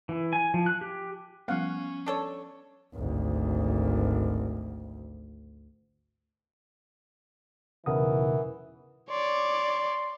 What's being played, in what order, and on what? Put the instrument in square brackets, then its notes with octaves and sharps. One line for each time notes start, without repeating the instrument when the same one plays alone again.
[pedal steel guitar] E3
G#5
F3
F#6
G4
[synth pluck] F3 G3 B3 [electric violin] C#4 [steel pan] F5 F#5
[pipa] D4 A4 C#5
[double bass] G#1 D2
[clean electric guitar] B1 E2 C#3 [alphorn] E3 [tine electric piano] A#4 F#5 D#6
[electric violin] C#5 D5 [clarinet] C6